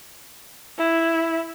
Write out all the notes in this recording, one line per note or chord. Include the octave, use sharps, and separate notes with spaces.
E4